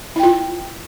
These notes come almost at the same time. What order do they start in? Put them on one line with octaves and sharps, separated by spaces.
E4 G5 F4